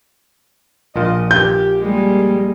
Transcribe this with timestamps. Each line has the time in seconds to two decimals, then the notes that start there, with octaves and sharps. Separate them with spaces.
0.96 A#1 A#2 F4 D#5
1.31 G4 G6
1.82 G3 G#3 A#3